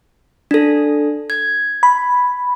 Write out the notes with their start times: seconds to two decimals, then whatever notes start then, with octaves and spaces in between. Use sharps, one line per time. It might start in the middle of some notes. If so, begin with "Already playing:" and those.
0.51 D4 A4
1.30 G#6
1.83 B5